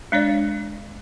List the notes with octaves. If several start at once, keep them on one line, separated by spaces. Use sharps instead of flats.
G#3 D4 C#5 D5